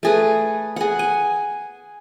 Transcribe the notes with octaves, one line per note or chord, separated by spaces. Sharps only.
A3 G#4 B4
G#4 F#5
G#5